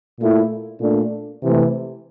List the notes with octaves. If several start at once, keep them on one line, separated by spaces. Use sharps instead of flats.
A#2 A3 E4
A#2 A3 D4
C3 E3 A3